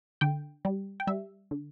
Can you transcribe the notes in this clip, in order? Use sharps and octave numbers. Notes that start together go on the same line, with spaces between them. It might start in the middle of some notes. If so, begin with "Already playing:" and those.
D3 G5
G3
G5
G3 E5
D3